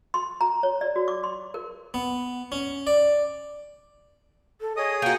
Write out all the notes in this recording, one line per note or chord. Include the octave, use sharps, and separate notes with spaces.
C6
A#5
C#5
D5
F#4
D6
C6
A#4
B3
C#4
D5
A4
G#4 C#5 D#5 D#6
A#3 F#4 G5